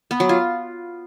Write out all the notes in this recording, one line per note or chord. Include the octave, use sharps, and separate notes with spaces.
B3
F#3
F4